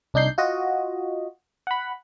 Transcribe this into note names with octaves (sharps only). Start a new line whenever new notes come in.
C2 D4 D#4 G6 C7
F4 F#4 D#5
F#5 B5